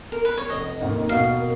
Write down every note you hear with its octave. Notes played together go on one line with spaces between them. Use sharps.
A#4
B4
C#5
F1 D#5
D#2 D#3 A#3 D#4
B2 F5
A#4